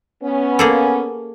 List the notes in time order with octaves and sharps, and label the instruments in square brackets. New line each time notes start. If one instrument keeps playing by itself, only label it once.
[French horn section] B3 C#4
[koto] A#3 G#4 A4